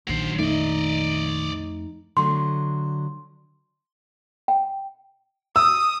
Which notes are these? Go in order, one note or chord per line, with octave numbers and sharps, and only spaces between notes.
A#1 D#3 F#3 C5
F2 A3 D#4 D5 D#5
D3 F#3 A3 C6
G5
D#6 E6